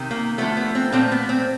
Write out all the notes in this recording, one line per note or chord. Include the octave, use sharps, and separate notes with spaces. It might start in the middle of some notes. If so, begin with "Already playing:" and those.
Already playing: C3 D#3
A#3
D3 F3 A3 B3
B3
C4
A#2 F3 A3 C4
B3
C4